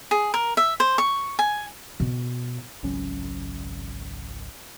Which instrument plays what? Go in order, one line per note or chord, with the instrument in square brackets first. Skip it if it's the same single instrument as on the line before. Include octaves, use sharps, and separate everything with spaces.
[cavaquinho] G#4
A#4
E5
C5
C#6
G#5
[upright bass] B2
[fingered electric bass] G#1 C#2 F#3 C#4